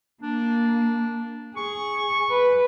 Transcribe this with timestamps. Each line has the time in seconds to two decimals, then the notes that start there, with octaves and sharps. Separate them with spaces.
0.23 A#3 D4
1.57 G#4 C#6
2.30 B4